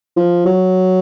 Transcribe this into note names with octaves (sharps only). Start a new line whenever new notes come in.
F3
F#3